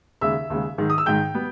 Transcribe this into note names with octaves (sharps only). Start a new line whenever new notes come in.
D#2 C#3 G#3 E5 E6
D#2 C#3 G#3
G#2 D#3 G#3
D#6
E6
G#2 D#3 G#3 G5 G6
G3 B3